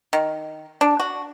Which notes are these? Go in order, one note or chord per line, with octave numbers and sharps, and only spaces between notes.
D#3
D4
F#4